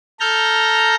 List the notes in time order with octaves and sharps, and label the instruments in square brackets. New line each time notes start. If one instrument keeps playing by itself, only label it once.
[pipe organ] A4 A#5 F6 G6